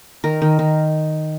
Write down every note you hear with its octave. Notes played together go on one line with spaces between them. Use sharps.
D#3 A#4
D#3
D#3